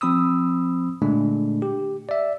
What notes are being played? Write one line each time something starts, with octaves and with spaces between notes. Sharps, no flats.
F3 C4 B5 D#6 E6
A#2 D3 G#3 A3 D4
G4
D5 E5